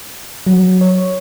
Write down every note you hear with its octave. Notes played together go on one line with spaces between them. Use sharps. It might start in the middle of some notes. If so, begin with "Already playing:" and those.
F#3
C#5